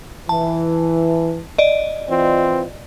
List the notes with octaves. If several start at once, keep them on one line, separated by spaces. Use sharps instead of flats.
E3 A5
D5 D#5
E3 C4 F4